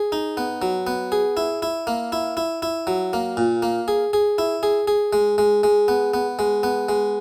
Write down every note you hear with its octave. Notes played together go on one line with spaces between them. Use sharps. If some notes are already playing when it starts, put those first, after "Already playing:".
Already playing: G#4
D#4
B3
F#3
B3
G#4
E4
E4
A#3
E4
E4
E4
F#3
A#3
A#2
A#3
G#4
G#4
E4
G#4
G#4
G#3
G#3
G#3
B3
B3
G#3
B3
G#3